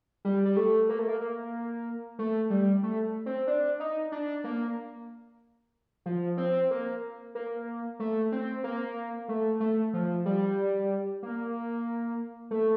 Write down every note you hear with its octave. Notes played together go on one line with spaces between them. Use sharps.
G3
G3
A3
A#3
A3
A#3
A#3
A3
G3
A3
C4
D4
D#4
D4
A#3
F3
C4
A#3
A#3
A3
C4
A#3
A3
A3
F3
G3
A#3
A3